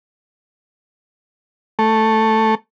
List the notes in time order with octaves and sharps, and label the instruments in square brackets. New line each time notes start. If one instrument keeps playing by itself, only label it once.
[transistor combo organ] A3